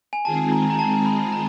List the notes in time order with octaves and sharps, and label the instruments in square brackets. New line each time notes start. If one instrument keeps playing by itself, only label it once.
[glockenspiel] G#5
[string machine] D#3 G#3 C4 F4 G#4 [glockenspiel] A5
[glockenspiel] A#5
A#5
A5
B5
A#5